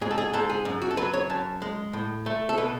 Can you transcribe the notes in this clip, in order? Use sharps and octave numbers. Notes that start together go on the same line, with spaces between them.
G#2 G#4
A4
G#4
G#2 A4
G#4
F#2
F#4
A4
F#3 B4
C#5
F#2 A5
G#3
A2
A3
A4
B2 B4